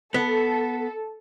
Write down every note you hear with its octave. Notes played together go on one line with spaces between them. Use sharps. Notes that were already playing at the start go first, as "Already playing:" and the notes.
B3 A4